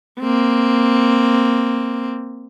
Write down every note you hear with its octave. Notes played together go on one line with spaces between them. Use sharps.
A#3 C4